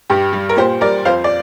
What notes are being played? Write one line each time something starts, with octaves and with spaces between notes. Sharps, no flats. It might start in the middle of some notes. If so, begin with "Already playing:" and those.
G2 G4
G3
A#4
A#2 G4 C5
G3 A#4 D5
F2 C5 F5
D5